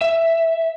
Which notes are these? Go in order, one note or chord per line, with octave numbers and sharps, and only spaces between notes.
E5